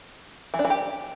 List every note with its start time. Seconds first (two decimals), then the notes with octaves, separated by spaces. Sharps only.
0.54 E3
0.59 D4
0.65 E3
0.70 G4